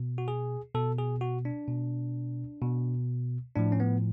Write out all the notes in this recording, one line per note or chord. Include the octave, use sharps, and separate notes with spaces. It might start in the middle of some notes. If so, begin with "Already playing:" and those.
Already playing: B2
F#4
G#4
B2 A4
G#4
F#4
D4
B2
B2
A2 F3 D4
C#4
B3